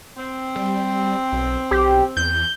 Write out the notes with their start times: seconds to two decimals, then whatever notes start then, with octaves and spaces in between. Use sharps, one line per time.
0.17 C4
0.56 G3
1.32 B1
1.71 B1 G4
2.17 E2 G6